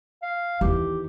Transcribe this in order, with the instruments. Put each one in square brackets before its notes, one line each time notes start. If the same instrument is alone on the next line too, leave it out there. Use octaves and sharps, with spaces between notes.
[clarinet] F5
[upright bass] E2 D#3 [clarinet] G4